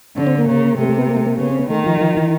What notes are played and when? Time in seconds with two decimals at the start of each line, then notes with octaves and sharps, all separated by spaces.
0.17 D3 C#4
0.27 C4
0.38 A#3
0.48 C#3
0.78 C3 A3
0.89 A3
0.98 B3
1.09 A#3
1.17 A3
1.27 A#3
1.39 C#3 B3
1.49 C4
1.59 B3
1.70 D#3 A3
1.86 F3
2.01 F3
2.17 E3